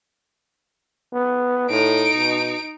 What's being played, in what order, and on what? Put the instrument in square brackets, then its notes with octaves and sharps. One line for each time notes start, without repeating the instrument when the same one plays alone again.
[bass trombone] B3
[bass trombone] A2 [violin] D#4 D7
[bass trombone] B2